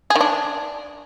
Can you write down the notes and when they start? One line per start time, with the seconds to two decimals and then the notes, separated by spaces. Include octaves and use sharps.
0.10 G#4
0.15 D#3
0.21 D4